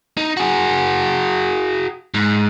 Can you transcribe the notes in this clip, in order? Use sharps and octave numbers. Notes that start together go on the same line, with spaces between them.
D#4
F#4 G#4
G#2